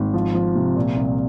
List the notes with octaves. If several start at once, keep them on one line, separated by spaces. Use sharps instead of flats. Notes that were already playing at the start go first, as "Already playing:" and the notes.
Already playing: G#1
F3
F3
C3
A#2
C2